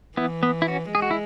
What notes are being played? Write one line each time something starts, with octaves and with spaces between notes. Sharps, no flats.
E3 B3 E4
B3
E4
C#4 F#4
G#3 G#4
F#4
E4